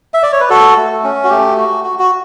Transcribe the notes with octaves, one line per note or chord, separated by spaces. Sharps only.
E5
D5
C#5
B4
F#4 A4
A3
C#4
F#4
A3 G4
F#4
F#4
F#4